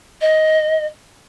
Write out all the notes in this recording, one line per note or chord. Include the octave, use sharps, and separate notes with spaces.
D#5